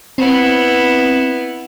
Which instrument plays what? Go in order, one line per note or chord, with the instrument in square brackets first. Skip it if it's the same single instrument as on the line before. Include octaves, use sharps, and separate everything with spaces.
[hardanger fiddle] B3 E4 [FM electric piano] C4